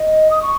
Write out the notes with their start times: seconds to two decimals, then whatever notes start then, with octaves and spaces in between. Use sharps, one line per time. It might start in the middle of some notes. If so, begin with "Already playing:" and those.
Already playing: D#5
0.31 D#6
0.42 C#6